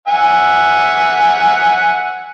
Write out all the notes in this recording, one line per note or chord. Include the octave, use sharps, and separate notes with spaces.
E5 F#5 G#5